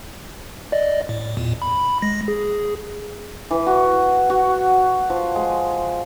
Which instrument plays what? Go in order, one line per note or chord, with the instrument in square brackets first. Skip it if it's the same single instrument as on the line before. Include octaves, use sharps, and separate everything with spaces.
[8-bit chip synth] D5 D#5
A2
E2 A#2
B5
G#3 A#6
G#4
[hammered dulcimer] E3
F#4
F#4
F3
G#3